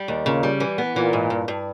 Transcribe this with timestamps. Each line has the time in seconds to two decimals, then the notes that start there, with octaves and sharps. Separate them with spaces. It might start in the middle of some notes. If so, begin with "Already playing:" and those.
Already playing: G3
0.08 D#2
0.26 A#2 C#3
0.43 G3
0.60 E3
0.78 B3
0.96 A#2 E3
1.13 G#2
1.30 G2
1.48 G2